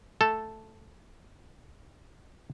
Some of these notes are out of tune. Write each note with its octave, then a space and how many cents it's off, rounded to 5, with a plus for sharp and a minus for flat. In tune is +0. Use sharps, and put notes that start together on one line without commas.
A3 +0 A4 +0